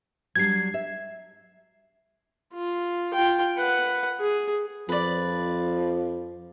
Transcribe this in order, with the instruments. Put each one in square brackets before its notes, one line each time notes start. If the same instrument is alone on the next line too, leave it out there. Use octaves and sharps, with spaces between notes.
[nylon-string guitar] F#3 G3 D4 [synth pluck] G#6 C7
[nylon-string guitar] E5
[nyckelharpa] F4
F4 G5
B4 F#5
G#4
[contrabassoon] F2 [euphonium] F3 [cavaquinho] B4 D5